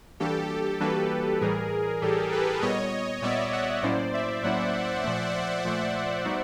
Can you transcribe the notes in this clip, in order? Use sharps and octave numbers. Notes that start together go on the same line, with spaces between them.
E3 G3 A#3 D4 F#4 G4 A4
E3 G3 A#3 D4 F#4 A4 B4
A2 E3 G3 G#4 A#4
A2 E3 G3 G4 A4
A4 B4
A#2 G3 B3 C#5 D#5
A#2 G3 B3 D5 E5
E5 F#5
A2 F#3 A#3 C#4 E4 C5 D5
D5 E5
A2 F#3 A#3 C#4 E4 E5 F#5
A#2 F3 A3
A#2 F3 A3
G3 B3 D#4 F#4